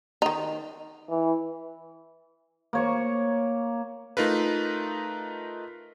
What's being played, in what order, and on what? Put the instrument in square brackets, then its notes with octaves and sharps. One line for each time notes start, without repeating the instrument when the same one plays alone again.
[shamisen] D#3 D#4
[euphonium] E3
[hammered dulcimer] A#3 C#5 C#6
[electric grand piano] A3 D#4 F4 A#4 B4